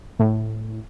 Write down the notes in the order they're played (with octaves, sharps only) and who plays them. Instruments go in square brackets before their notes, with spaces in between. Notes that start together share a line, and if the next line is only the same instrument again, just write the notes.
[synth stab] A2